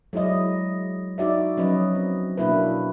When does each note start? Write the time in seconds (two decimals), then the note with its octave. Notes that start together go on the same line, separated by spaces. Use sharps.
0.13 F#3 G#3 E4 D5 D#5
1.18 D#4 F#4 D5 E5
1.57 F3 F#3 C#4 B4 D#5
1.95 C4
2.38 B2 A#3 D4 E4 F#4 B4